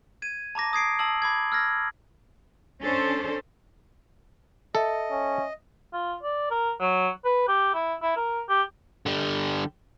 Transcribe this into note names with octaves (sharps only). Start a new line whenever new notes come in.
G#6 D#7
A5 A#5 D6 A#6
D#6 G#6 C7 D7
A5 D#6 E6 F#7
B5 D6 G#6
E6 F6 G#6 A#6
C#4 D4 A4 C5
A4 D#5 E5 C#7
C#4
F4
D5
A#4
F#3
B4
G4
E4
E4
A#4
G4
D3 G3